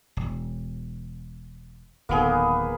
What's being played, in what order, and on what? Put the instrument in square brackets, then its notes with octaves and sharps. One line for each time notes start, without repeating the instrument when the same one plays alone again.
[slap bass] E1
[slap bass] D1 D#3 [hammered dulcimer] A#3 B3 G#4